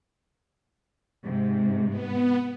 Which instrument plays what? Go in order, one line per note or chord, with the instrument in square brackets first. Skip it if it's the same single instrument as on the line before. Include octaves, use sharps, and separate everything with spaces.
[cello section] G#2 C3
[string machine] B3